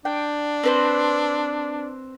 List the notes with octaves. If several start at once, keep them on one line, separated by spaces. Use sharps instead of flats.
D4 G5
C4 B4 C5